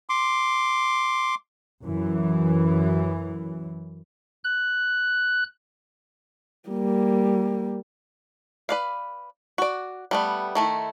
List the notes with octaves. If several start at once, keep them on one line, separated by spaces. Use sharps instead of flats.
C6 D6
F#2 E3
F#6
G3 A#3
B4 D5 F5
F#4 D5
G3 A3 B3
D#3 A3 E4